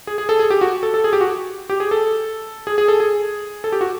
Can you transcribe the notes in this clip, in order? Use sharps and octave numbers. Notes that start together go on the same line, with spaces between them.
G#4
G#4
A4
G#4
G4
F#4
A4
A4
G#4
G4
F#4
G4
G#4
A4
G#4
G#4
A4
G#4
A4
G4
F#4